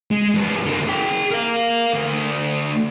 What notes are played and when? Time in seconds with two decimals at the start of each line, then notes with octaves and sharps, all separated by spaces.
0.11 G#3
0.35 F#2 B3
0.65 D3 A#3
0.88 G#4 G5
1.31 A#4 F5
1.93 D2